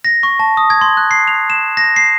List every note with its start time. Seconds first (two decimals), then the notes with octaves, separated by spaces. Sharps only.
0.05 A#6
0.23 C#6
0.40 A5
0.57 D#6
0.70 G#6
0.81 C6
0.97 F#6
1.11 C7
1.28 F7
1.50 E7
1.77 A#6
1.96 C7